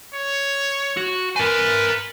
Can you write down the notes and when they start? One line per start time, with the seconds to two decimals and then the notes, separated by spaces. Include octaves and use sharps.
0.13 C#5
0.97 F#4
1.36 A#4 B4 G#5